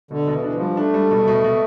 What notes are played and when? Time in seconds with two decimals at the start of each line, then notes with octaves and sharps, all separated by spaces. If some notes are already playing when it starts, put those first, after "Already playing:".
0.11 B2 D3
0.27 B2
0.32 E3
0.44 E3 D4
0.55 F3
0.60 G3
0.77 A3 D4
0.94 G3
1.11 B2
1.28 B2
1.44 B2